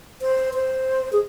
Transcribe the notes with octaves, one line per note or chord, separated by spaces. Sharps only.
C5
C5
G#4